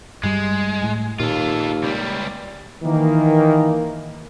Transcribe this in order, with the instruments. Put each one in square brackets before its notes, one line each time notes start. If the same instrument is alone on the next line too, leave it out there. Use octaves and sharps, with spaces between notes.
[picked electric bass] G2 G3 [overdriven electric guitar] G#3
[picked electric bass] A2
[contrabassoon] D#2 [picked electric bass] A#2 [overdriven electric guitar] F4 A4
[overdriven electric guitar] C#2 G3
[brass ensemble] D#3 E3 A#3